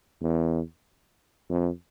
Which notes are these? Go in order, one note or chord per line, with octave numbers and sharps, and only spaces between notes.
E2
F2